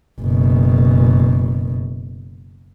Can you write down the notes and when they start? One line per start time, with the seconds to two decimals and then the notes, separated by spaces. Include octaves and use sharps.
0.20 F#1 B2